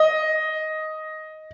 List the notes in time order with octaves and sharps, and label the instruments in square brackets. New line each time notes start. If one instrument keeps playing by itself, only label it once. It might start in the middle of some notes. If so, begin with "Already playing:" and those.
Already playing: [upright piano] D#5